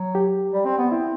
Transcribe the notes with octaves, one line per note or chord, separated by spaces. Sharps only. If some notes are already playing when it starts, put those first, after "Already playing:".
Already playing: F#3
G4
G3
C4
B3
C4 E4